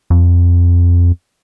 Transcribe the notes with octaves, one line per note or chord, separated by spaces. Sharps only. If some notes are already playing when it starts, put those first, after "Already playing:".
F2